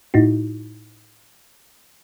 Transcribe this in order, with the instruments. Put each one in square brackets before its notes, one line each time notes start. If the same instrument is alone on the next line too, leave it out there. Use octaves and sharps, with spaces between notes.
[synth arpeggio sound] A2 D#4 E4 F#4